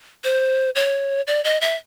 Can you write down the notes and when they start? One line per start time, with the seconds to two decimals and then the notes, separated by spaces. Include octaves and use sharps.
0.24 C5
0.75 C#5
1.27 D5
1.44 D#5
1.61 E5